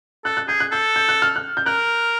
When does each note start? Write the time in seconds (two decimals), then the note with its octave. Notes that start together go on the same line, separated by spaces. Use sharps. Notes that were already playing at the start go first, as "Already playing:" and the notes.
0.25 A4 F#6
0.37 F#6
0.48 G#4 G6
0.60 F#6
0.72 A4 G6
0.96 G6
1.08 F#6
1.22 F6
1.36 F#6
1.57 G6
1.66 A#4 F#6